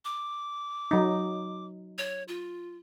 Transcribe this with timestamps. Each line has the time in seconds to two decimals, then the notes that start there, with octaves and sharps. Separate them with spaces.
0.05 D6
0.91 F#3 D#4
1.98 C#5
2.28 F4